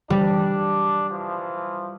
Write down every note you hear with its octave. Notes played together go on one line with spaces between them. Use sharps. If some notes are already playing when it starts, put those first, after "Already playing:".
G3 D4
E3 F3